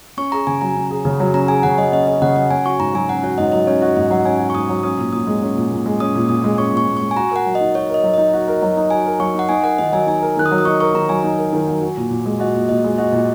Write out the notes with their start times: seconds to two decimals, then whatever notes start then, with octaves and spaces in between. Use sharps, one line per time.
0.17 C#4 C#6
0.32 G#4 A#5
0.47 C#3 G#5
0.61 F#3 A#5
0.76 C#4
0.91 G#4
1.05 C#3
1.20 F#3
1.34 C#4 A#5
1.48 G#4 G#5
1.63 C#3 F#5
1.78 F#3 D#5
1.92 C#4 D#5
2.07 G#4 D#5
2.22 C#3 F#5
2.36 F#3 F#5
2.51 C#4 G#5
2.65 F#4 C#6
2.79 G#2 A#5
2.94 F#3 G#5
3.09 C#4 F#5
3.23 F#4 C#5
3.38 G#2 D#5
3.52 F#3 D#5
3.67 C#4 C#5
3.82 F#4 D#5
3.97 G#2 D#5
4.10 F#3 F#5
4.25 C#4 G#5
4.40 F#4
4.50 C#6
4.55 G#2 D#6
4.69 F#3
4.83 C#4 D#6
4.98 A#2
5.13 A#2 D#6
5.27 G#3
5.42 C#4
5.56 A#2
5.71 A#2
5.86 G#3
6.00 C#4 D#6
6.15 A#2
6.29 A#2 D#6
6.44 G#3
6.58 C#4 C#6
6.73 A#2 C#6
6.88 A#2
6.97 G#3 C#6
7.11 G#5
7.16 F#4 A#5
7.31 A#4 F#5
7.46 F#3
7.55 D#5
7.61 D#4
7.75 F#4 C#5
7.89 A#4 D#5
8.03 F#3
8.14 D#4 D#5
8.33 F#4
8.48 A#4
8.62 F#3
8.77 D#4
8.91 F#4 G#5
9.06 A#4
9.20 F#3 C#6
9.35 D#4 F#5
9.49 D#4 G#5
9.63 A#4 F#5
9.78 D#3 D#5
9.92 F#3 G#5
10.07 D#4 G#5
10.22 A#4
10.37 D#3 F#6
10.46 D#6
10.51 F#3
10.58 D#6
10.65 D#4 C#6
10.80 A#4 C#6
10.94 D#3 A#5
11.09 F#3 G#5
11.24 D#4
11.39 A#4
11.53 D#3
11.68 F#3
11.81 F#4
11.97 A#2
12.11 A#2
12.26 G#3
12.40 F#4 D#5
12.55 A#2
12.69 A#2 D#5
12.84 G#3
12.98 F#4 D#5
13.12 A#2